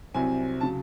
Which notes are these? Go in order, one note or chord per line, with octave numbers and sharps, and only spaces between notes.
C2 C3 F#3 C4 G#5
C#3 F#3 A5